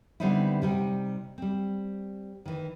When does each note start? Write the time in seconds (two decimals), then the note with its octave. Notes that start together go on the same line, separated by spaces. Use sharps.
0.20 D3 G3 B3 C4 D#4 E4
0.62 C3 G3 D#4
1.38 G3 C4
2.46 D#3 E3